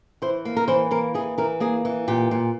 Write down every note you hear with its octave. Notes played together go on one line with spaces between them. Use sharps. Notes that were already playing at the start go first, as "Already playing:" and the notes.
E3 C5
A#3
A#4
E3 C5
A#3 A#4
E3 G#4
E3 A#4
A#3 G#4
E3
A#2 G4
A#2